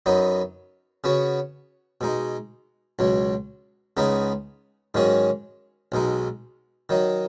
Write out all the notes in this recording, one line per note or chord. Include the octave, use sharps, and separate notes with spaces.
F#2 F#3 B3 D#4
C#3 B3 F#4 C#5
B2 G#3 D#4
C#2 B2 F#3
C#2 C#3 B3 D#4 G#4
G#2 D#3 F#3 C#4 G#4
B1 B2 G#3 D#4
D#3 F#3 D#4